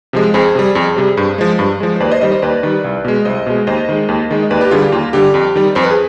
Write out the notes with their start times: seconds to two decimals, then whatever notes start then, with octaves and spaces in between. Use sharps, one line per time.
0.13 C3 F3 G#3
0.34 F2 G#4 C5
0.55 C3 G3
0.75 F2
0.97 C3 G3
1.17 G2
1.38 F3 G#3
1.59 G2
1.80 F3 G#3
1.96 C5
2.00 D#2 B4 D5
2.11 C5 D#5
2.21 D#3 G3 C5 D#5
2.32 C5 D#5
2.42 D#2 B4 D5
2.63 D#3 G3
2.84 C2
3.05 B2 G#3
3.25 C2 C5 D#5
3.46 B2 G#3
3.67 D#2 C5 D#5
3.88 D#3 G#3
4.09 D#2
4.31 D#3 G#3
4.43 D#5
4.50 D#2 B4 D5
4.61 G4 B4
4.71 D3 F4 G#4
4.75 G3
4.82 G4
4.92 D#2 F4
5.13 D3 G3 G4
5.34 F2
5.55 D#3 G3
5.75 F2 C5
5.84 B4
5.90 G#4